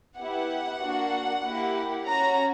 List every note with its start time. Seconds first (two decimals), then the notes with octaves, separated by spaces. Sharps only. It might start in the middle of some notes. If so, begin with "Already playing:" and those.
0.19 B3 E4 G4 F#5
0.81 A#3 D4 F#4
1.45 A#3 E4 G4
2.06 C#4 F#4 A#5